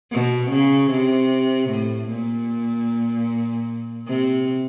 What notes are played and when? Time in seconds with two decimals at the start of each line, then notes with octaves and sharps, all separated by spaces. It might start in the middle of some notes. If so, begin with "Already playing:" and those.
0.12 B2
0.51 C#3
0.91 C3
1.70 A2
2.09 A#2
4.07 C3